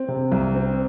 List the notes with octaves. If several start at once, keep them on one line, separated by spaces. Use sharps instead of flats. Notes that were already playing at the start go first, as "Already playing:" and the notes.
Already playing: C4
C3
C2
C4